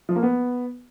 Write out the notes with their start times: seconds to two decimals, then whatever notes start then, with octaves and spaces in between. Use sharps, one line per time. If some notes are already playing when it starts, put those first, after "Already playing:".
0.09 F3
0.16 A#3
0.23 B3